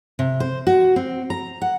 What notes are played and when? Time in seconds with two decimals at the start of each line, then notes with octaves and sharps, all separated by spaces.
0.19 C3
0.40 C5
0.67 F#4
0.96 C4
1.30 A#5
1.62 F#5